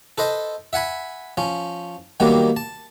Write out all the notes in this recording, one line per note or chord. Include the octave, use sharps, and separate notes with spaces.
A4 B4 C5 D#5
E5 F#5 G#5 B5
F3 C#4
D#3 F#3 G3 A#3 B3
A5